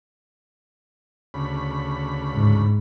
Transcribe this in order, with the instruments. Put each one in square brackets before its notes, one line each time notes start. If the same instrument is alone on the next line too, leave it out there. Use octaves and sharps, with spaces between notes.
[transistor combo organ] D2 C#3 B5
[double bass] G#2